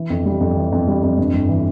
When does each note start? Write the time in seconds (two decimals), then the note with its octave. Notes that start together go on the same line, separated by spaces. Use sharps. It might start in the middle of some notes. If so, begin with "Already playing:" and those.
Already playing: E3
0.10 F2
0.25 G3
0.41 F2
0.56 E3
0.72 F2
0.87 G3
1.03 F2
1.18 G2
1.33 G1
1.49 E3